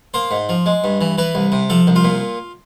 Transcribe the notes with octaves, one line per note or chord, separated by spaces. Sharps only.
A#3 C5
G#2
F3
G#3
G2
E3
E3 B4
C2
C3
F3 A4
C2
F4
A#2